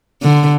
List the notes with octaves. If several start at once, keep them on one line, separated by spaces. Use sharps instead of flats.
D3